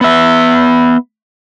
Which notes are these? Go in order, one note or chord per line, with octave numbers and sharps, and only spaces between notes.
B3 E5